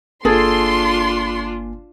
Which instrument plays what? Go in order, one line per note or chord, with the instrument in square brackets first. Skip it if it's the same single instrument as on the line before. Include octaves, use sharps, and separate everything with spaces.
[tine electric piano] G1 A#3 G#5 [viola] D4 F4 [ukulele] G#4 A4 [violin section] C6